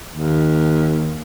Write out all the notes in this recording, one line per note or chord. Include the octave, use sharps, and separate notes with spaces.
D#2